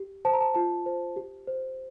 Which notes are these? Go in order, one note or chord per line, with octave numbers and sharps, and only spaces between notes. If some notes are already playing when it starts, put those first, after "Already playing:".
Already playing: G4
C5 A5
A#5
A5
F4 A5
C5
G4
C5